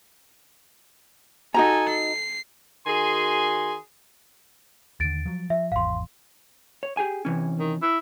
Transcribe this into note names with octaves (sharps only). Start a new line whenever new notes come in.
D#4 F#4 A4 G#5 A#5
C7
D#3 F#4 G#4 G#5 C6
D#2 D3 A6 D7
F3 F#3
F3 E5
G#1 E2 F5 C6
C#5
G4 G#4 G#5
C3 E3 C#4
D#3
E4